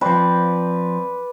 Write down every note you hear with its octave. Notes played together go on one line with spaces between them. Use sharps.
F3 C4 B4 D5